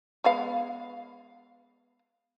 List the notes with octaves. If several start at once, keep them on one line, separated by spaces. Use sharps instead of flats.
G#3 B3 F5